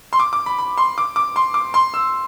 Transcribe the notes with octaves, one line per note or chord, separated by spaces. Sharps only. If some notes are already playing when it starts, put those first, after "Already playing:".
C6
D6
D6
B5
B5
C6
D6
D6
C6
D6
C6
E6